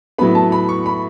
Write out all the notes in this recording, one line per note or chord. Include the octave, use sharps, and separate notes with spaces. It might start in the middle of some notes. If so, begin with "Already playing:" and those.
A2 F#3 B3 B5
A5
B5
C#6
B5